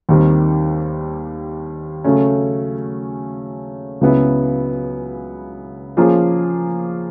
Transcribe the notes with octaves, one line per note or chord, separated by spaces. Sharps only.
D#2 D#3 G3 C4
C#3 F#3 A3 C#4
C#2 C#3 F#3 B3 E4
F3 A#3 C#4 F4 G#4